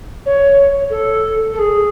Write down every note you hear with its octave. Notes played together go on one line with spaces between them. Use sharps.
C#5
A4
A4
G#4